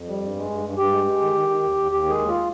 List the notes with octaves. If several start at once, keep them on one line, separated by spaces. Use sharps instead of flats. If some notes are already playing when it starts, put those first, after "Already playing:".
Already playing: F2
G3
G2
G#3
G2
G2
G2 G4
G#3
G#3
D#3
D#3
D#3
D#2
D#2
D#2 G4
D#3 G#3 G#4
D#2
F4